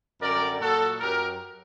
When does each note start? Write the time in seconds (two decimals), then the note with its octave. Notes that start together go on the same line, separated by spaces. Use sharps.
0.22 F#2 D3 G3 A#4 D5
0.60 A#2 F#3 F#4 A4
1.00 F#2 F#3 G4 A#4